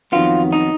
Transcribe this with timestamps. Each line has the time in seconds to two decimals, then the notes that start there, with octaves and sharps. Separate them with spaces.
0.12 F2 D#3 F#3 B3 F4
0.53 D#4